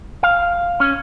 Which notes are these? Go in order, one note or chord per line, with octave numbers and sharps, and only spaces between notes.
F5
C#4